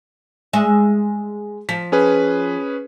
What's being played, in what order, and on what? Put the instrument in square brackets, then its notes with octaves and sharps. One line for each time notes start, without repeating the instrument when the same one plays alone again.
[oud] G#3 E5
[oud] F3 [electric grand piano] B6
[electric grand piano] C#4 G#4 B4